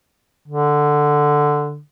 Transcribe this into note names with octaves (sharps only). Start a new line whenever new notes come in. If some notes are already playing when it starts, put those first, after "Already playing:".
D3